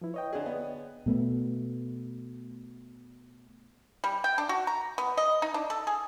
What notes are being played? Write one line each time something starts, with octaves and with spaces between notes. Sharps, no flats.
F3 E4 B4
B4 C#5 D#5 G5
D3 G#4 D5
B3
B2 A3 B3
G3
G5
D4
F#4
A#5
B3
D#5
D#4
D4
A4
G#4